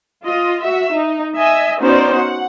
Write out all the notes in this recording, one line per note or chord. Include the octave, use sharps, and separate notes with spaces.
F4 D#5
F#4 E5
D#4
D#5 E5 G#5
B3 C#4 D#4 F#4 C5 D5
F#5